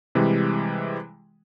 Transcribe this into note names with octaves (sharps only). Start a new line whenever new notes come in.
C3 E3 G3 G#3